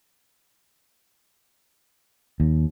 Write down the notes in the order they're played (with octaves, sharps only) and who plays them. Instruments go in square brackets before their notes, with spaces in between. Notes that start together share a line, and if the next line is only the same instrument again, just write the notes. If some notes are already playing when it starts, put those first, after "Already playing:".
[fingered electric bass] D#2